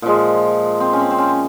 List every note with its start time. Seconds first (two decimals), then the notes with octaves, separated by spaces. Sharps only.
0.02 A#2 F3 G#3
0.80 C4
0.93 C#4
1.00 C4
1.11 C4
1.18 C#4